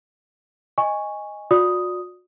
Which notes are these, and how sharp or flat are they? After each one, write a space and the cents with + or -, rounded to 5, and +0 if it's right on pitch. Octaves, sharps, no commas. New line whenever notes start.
D#5 +0 G#5 -15 C#6 +0
F#4 -40 D5 +0 D#6 +0